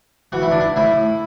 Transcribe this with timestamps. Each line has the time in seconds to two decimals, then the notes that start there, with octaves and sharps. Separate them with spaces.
0.32 E3 F#4
0.42 E4
0.51 D4
0.60 E4
0.76 A2 E4